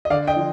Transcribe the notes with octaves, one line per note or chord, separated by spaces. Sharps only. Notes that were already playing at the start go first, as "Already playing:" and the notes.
D#5
D3 D5 F5
D#5 G5
F3